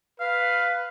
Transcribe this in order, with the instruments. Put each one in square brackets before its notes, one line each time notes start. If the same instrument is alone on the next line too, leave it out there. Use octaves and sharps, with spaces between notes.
[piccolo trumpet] B4 [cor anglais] F5